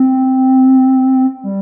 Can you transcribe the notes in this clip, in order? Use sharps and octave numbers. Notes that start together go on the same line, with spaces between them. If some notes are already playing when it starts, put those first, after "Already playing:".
Already playing: C4
G3